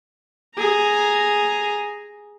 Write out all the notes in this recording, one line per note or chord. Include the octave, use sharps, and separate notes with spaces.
G#4 A#5